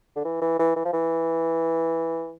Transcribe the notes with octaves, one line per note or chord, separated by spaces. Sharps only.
D3
E3
E3
E3
E3
F3
E3